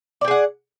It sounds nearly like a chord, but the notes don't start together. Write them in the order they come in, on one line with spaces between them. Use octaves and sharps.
D5 G5 G#4 F#5